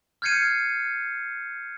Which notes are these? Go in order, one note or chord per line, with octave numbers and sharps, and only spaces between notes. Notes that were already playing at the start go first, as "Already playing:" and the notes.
F6 G6 G#6 C7 C#7 D#7